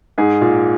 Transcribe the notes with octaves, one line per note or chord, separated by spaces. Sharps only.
G#2 G#4
A#2